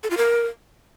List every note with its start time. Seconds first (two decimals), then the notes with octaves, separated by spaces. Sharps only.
0.03 A4
0.10 F4
0.17 A#4